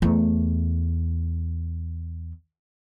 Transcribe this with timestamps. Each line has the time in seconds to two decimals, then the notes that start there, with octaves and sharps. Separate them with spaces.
0.02 E2 A3